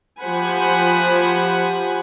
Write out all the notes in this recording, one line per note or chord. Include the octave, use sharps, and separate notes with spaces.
F3 G4 C5 F#5 G#5 B5